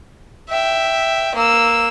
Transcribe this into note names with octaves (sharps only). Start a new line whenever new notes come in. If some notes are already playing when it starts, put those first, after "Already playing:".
E5 G5
A#3 E6